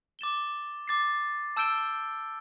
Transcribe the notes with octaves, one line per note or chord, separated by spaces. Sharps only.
D6 A6 E7 G7
D6 A6 C7
A5 E6 G6 D7 G7